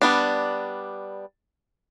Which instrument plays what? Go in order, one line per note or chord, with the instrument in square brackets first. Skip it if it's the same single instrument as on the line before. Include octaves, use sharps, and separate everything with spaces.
[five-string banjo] G3 B3 D4